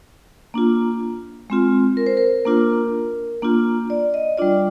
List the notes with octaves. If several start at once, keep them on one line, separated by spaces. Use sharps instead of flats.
A#3 D4 F4
G#3 C4 F4
A#4
C5
A#4
A#3 D4 F4
A#3 D4 F4
D5
D#5
G3 D4 F4 D5